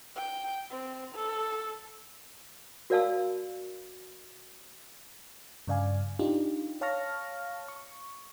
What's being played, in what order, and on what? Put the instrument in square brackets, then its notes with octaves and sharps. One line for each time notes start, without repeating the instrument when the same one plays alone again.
[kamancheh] G5
C4
A4
[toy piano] F#4 A#4 D5 F5 A5 E6
[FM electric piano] G2 C#3 D5 F5 G#5
D4 D#4 F4 G4
C#5 F5 A5 C#6 F6 A#6
C#6